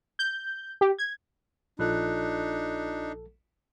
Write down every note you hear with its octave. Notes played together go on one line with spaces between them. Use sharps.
G6
G4
G#6
A#1 D4 D#4 F4 A4 F#6